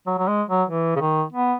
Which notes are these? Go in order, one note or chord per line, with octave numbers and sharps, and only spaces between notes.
F#3
F#3
G#3
F#3
E3
C#3
D#3
B3